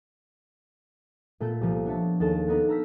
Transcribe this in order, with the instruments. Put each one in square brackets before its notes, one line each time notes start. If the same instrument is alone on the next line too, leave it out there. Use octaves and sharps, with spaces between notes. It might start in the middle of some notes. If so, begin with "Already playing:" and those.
[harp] A#2 A3 B3 A4 G6
C2 F3 A#3
B3 D4 C#5 E5 A5
D#2 G#4 A4 A5 A6 E7
B3 D4 D#4 A#4 B4
A5 A#5 E6 F6 G6 B6